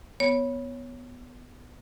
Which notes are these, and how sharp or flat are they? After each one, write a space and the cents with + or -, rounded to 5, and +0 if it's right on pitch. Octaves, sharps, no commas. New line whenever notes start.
B3 +0 C#5 +0